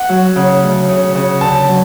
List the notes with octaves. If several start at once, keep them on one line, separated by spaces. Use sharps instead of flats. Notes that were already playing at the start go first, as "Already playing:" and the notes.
Already playing: F#5
F#3
C#3
D2
C#3
C#3
D3 A5
F#3